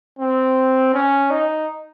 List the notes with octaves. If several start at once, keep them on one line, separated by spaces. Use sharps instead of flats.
C4
C#4
D#4